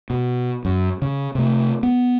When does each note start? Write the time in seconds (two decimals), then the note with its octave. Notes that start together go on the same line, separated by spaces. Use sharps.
0.10 B2
0.65 F#2
1.02 C#3
1.35 C3 A3
1.83 B3